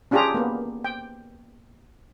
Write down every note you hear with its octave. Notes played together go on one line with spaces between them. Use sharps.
C#4 D4 F4 G4 G#4 A#5
A#3 B3
G5